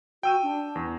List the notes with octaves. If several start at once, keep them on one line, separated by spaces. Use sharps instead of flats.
F#4 G5 E6 D#7
D4
E2